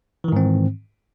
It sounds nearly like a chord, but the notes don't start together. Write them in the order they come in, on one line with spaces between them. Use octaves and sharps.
E3 D#3 G#2 C4